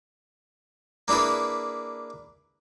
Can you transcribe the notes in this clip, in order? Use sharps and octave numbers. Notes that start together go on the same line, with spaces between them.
A#3 D4 E4 G#4 B4